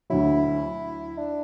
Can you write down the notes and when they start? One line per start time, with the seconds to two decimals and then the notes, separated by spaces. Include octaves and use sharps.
0.10 D2 D3 F#3 E4
1.18 D4